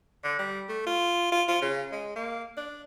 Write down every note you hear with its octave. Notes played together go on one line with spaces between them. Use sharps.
D3
G3
A3
F4
F4
F4
C#3
G#3
A#3
D4